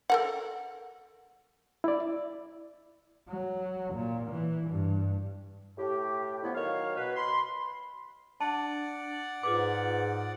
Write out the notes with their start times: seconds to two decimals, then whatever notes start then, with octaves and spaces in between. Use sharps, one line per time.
0.10 A4 A#4 F#5
1.84 E4 D5
3.28 F#3
3.94 A#2
4.31 E3
4.70 G2
5.78 A2 G4
6.42 A2 D3 F3 B3 E4
6.55 D#3 F#3 C#5 F5
6.96 B2 B4
7.15 B5 C6
8.41 D4 D5 F#5 A5
9.43 G#2 F4 G#4 B4 D6